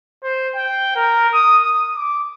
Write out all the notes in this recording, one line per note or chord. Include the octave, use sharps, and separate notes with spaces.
C5
G5
A#4
D#6
D#6
D6